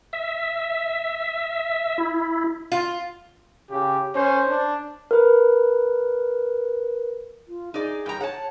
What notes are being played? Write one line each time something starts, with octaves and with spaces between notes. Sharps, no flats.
E5
E4
F4
C#3 G4
C#4 C5
D4
A#4 B4
F4
D#4 G#4 D5
G2 G5 A#5
C#5 F#5 A5